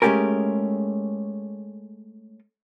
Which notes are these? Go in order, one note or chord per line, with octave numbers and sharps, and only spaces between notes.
G#3 A3 C#4 G4 G#4 A#4